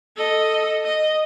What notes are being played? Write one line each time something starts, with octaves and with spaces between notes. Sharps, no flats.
A4 D#5
D#5